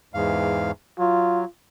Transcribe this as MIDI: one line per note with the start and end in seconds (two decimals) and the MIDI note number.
0.14 0.71 40
0.14 0.71 44
0.14 0.71 77
0.99 1.45 54
0.99 1.46 65